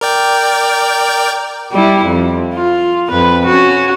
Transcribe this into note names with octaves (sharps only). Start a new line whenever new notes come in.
A#4 D5 G5
G3 E4
F2
F4
F2 B4
C#4 F#4